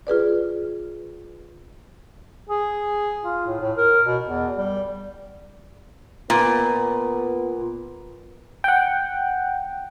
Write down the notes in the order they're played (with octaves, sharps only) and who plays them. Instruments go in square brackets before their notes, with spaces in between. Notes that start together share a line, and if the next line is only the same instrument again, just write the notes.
[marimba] F4 G#4 B4 D5
[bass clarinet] G#4
F4
A2
A2
A#4
B2
E2
G3
[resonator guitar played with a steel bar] A#2 [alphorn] B3
[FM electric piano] F#5 G5